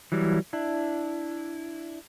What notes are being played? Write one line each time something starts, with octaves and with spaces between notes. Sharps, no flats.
E3 F#3 G3
D4 E4